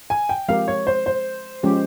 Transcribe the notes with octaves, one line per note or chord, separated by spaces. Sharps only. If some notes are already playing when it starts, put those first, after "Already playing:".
G#5
G5
F3 G#3 C4 G4 A#4 F5
C#5
C5
C5
F3 G#3 C#4 G4